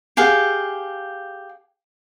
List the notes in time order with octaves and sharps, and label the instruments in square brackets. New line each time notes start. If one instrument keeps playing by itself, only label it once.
[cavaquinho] G4 G#4 F5 F#5